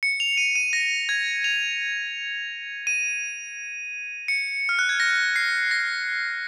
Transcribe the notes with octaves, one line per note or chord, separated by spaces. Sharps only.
C#7
F7
D#7
D#7
A#6
G#6
F7
D#7
C#7
F6
F#6
G#6
A#6
C7
A#6